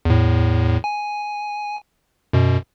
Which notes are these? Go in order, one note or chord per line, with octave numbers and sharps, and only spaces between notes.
E2 A2
G#5
F#2 B2